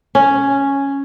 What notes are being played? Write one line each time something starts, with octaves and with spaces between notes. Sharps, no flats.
C#4